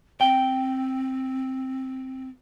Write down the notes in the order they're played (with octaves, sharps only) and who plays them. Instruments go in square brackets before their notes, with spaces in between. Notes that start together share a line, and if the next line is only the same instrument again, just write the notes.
[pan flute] C4 [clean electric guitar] G5